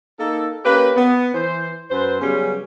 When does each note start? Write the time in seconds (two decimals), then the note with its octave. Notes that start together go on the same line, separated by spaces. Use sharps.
0.19 A#3 D#4 A4
0.65 A#3 C#4 G4 B4
0.96 B3
1.34 E3 C5
1.91 F#2 B4 C5
2.20 C#3 F#3 G3 B3 C#4